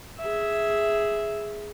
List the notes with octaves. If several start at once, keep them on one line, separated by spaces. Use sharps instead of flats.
G#4 E5